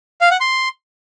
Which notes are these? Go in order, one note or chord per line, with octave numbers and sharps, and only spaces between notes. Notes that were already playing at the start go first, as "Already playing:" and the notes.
F5
F#5
C6